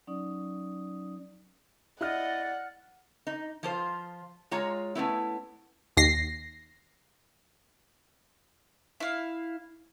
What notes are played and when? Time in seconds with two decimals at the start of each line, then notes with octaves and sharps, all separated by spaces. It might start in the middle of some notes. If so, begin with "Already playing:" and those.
0.07 F#3 C#4 D#4 D5 D#6
2.01 E4 D5 D#5 F#5 F6
3.27 D#4
3.63 F3 F4 C5
4.51 G#3 F4 C#5 A#5
4.95 A3 B3 C#4 E4
5.97 D#2 A#6 C7
9.00 E4 F5